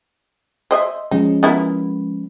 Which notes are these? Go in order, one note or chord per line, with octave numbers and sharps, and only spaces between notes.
C5 D#5 E5
F3 G#3 C#4 D#4
B3 E4 A#4